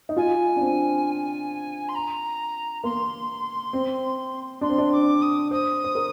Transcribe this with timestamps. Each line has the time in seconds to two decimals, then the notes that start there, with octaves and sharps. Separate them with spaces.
0.09 D#4
0.17 F4 G#5
0.56 D4
0.61 C4
1.88 C6
1.94 A#5
2.84 A#3 C6
3.73 C4
4.61 D4 C6
4.69 C4
4.78 D4
4.92 D6
5.21 D#6
5.51 C5 D#6
5.84 C5
5.95 A#4